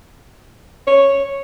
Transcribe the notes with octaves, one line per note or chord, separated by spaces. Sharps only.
C#5